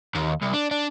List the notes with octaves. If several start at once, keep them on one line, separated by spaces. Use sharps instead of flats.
D#2
C2
D4
D4